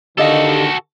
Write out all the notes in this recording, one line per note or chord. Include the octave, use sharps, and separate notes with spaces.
D3 D#3 F#4 G4 A4 D#5 F5